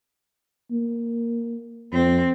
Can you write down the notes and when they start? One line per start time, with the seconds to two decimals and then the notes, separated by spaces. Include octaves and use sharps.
0.71 A#3
1.92 F2 C4